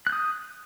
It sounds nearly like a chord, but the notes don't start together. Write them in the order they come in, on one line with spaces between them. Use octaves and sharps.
F#6 G6 D#6